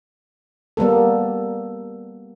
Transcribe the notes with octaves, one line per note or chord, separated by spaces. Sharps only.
G3 A#3 B3 A4